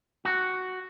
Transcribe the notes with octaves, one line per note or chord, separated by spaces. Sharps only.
F#4